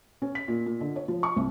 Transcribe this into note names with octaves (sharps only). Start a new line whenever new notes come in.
C#4
B6
A#2
A#2
D3
C#5
F3
C#6
C2